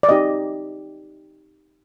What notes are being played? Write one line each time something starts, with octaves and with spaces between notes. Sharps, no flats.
D5
C4 D#4 G4 D#5